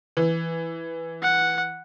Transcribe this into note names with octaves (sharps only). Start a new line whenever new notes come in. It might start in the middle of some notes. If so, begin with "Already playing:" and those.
E3
F#5